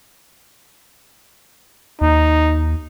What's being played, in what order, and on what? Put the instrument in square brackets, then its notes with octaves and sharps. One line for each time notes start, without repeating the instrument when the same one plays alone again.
[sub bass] D#2 [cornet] D#4